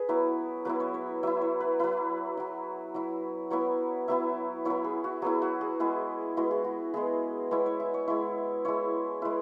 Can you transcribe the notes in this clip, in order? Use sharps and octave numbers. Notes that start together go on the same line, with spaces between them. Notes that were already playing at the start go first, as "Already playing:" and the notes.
Already playing: G#4 B4
F#3 B3 E4
F#3 B3 E4 B4
C#5
C#5
F#3 E4 E5
C#5
B4
F#3 E4 B4
F#3 E4
F#3 E4
F#3 B3 E4 C#5
F#3 B3 E4 E5
F#3 B3 E4 C#5
G#4
F#4
F#3 B3 E4 G#4
F#4
G#4
G#3 B3 E4 G#4
G#3 B3 E4 F#4
G#4
F#4
G#3 B3 E4 G#4
G#3 B3 E4 C#5
C#5
E5
C#5
G#3 E4 C#5
G#3 E4 C#5
G#3 E4 B4